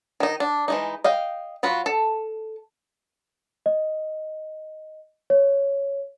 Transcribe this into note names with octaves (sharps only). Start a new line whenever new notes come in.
D#3 D#4
D4
E3 G#3 D#4
D#5 F5 G5
F#3 F4 F#4 B5
A4
D#5
C#5